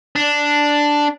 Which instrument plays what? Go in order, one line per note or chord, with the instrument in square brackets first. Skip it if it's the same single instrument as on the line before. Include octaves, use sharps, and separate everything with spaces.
[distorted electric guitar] D4